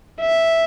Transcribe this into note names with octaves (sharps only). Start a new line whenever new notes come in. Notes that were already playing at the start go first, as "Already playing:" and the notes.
E5